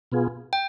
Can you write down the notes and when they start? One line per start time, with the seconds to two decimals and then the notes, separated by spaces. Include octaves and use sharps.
0.12 B2 B3 F4 G#4
0.53 G5